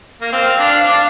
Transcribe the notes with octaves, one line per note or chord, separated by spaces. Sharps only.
A#3
C4 F5
D4
D4